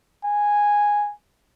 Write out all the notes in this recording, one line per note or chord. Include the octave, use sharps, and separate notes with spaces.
G#5